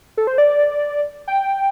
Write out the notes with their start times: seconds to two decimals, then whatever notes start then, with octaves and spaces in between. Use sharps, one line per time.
0.17 A4
0.27 C5
0.38 D5
1.28 G5